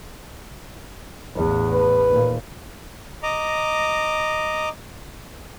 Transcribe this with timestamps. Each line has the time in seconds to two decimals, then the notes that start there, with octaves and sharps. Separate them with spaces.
1.36 A1 E2
1.73 B4
2.09 D#2 A#2
3.23 D#5 A#5 D6